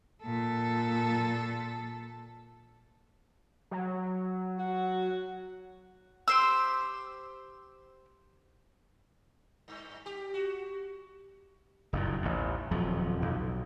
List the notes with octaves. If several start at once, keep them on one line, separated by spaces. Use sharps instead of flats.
A#2 A4
F#3
F#4
G4 C5 E6
G2
G4
F#4
F#1 G2 A#2
A1 D#2
D#1 F2 F3 F#3
B1